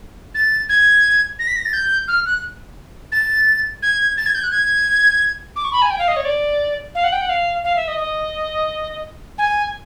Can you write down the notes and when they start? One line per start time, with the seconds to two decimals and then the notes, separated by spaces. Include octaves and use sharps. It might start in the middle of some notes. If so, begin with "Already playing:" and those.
0.35 A6
0.69 G#6
1.39 A#6
1.47 B6
1.56 A#6
1.65 A6
1.73 G6
2.08 F6
2.26 F#6
3.12 A6
3.82 G#6
4.17 A6
4.26 G#6
4.35 G6
4.43 F#6
4.51 G#6
5.56 D6
5.64 C#6
5.73 B5
5.82 G#5
5.90 G5
5.99 F5
6.08 D#5
6.16 C#5
6.25 D5
6.95 F5
7.04 F#5
7.12 G5
7.21 F#5
7.29 F5
7.64 F5
7.76 E5
7.88 D#5
7.99 D#5
9.38 G#5